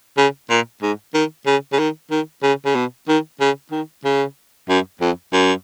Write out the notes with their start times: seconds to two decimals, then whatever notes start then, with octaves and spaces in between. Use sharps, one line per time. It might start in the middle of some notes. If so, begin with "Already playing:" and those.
0.17 C#3
0.50 A#2
0.82 G#2
1.14 D#3
1.46 C#3
1.72 C#3
1.79 D#3
2.11 D#3
2.43 C#3
2.65 C#3
2.75 B2
3.08 D#3
3.40 C#3
3.72 D#3
4.04 C#3
4.69 F#2
5.01 F2
5.33 F#2